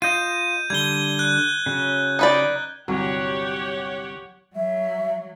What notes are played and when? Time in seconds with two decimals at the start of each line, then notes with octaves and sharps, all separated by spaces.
0.02 F4 D#5 G6 D#7
0.70 D3 G3 G#6 G7
1.19 F#6
1.66 C#3 F#3
2.19 D#4 B4 D5
2.88 G1 C2 F#3 G4 C#5 F#5
4.56 F#3 E5